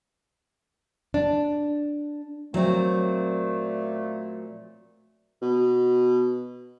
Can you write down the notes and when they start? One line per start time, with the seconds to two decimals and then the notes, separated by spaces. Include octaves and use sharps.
1.14 D4
2.54 A#2 F#3 A3 C4
5.42 B2